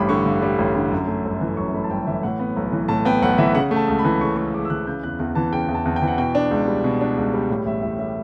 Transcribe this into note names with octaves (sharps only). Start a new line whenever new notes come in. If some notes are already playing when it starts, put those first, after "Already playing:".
Already playing: A1 G2 G3 B5 D6
D3 C#6
G2
G3
A1
D3
F#2
A3
G1
E3
F#2 C#6
A3 B5
A5
G1 G5
E3 E5
A2 F#5
B3
B1
E3
A2 A5
B3 G5
B1 F#5
E3 E5
C#3 F#5
A3
A5
C#2
B5
E3
C#3 C#6
A3 C#6
C#2 D6
E6
E3 F#6
C#3 G6
E2 F#6
E2 F#6
E3 A5
C#3 G5
E2
A5
E2
G5
E3
F#5
B2 G5
D4
C#2
G3
B2
D4
C#2
G3
A2
A1 E5
A1 E5
G3 E5